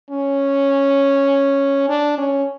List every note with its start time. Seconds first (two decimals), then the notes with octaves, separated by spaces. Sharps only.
0.10 C#4
1.89 D4
2.18 C#4